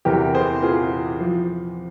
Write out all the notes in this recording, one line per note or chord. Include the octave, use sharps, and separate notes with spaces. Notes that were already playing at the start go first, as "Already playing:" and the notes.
E2 C3 E3 G4 A#4
G#4 C5
F4 G#4
F3